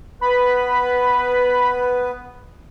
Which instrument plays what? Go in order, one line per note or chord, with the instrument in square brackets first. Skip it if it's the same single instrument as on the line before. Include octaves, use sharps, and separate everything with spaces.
[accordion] B3 B4 [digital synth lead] B5